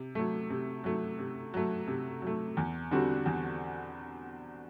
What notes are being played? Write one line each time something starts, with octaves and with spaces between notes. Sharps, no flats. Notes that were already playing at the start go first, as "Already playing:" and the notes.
Already playing: C3
F#3 A3
C3
F#3 A3
C3
F#3 A3
C3
F#3 A3
E2
D3 G3 C4 F#4
E2